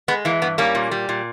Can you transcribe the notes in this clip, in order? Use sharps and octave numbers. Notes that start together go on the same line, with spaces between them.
G#3 B3
E3 A#3
G2 B3
G3 A#3 C#4
A#2
G3
A#2